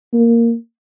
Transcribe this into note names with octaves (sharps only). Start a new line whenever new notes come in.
A#3